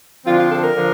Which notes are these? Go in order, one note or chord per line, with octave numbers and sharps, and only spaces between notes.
D3 F3 C4 F4
F4
A4
A#4
D3 F3